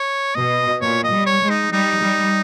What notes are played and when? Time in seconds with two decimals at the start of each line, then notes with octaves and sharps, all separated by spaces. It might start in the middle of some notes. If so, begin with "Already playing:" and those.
Already playing: C#5
0.35 B2 D#5
0.81 A#2 C#5
1.04 D#5
1.11 G3
1.26 C#5
1.41 G#3
1.50 D#4
1.72 G3 D#4
2.01 G3